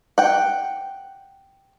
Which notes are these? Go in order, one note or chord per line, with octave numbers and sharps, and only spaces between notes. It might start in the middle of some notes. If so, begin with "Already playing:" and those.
F#5 G5